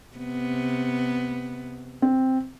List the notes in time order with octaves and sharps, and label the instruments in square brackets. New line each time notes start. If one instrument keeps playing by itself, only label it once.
[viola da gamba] C3 B3
[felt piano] C4